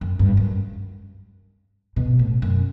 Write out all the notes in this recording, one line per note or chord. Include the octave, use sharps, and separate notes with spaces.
F#2
G2
F#2
B2
A2
F#2